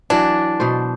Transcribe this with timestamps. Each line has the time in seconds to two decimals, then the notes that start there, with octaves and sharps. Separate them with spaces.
0.10 E3 F#3 D4
0.60 B2 C5